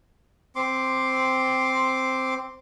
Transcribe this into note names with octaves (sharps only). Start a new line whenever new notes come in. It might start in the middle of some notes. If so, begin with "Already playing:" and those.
C4 C6 D6